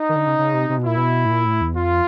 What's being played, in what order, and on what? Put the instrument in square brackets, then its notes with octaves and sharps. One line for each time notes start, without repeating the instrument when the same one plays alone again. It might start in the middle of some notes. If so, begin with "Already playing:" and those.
Already playing: [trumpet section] D#4
[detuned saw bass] D#3
D3
C#3
C#3
C3
C3
B2
[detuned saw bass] A#2 [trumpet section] E4
[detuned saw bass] B2
A2
A#2
A2
E2
[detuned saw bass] F2 [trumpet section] F4